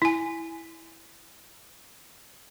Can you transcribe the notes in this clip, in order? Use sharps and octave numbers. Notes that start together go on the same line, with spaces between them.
E4 G#5